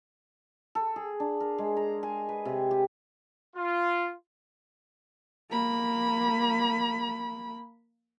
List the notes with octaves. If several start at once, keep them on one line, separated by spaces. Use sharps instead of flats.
A4
G#4
D4
A#4
G#3
A#5
G#5
B4
C3
G4
F4
A#3 B5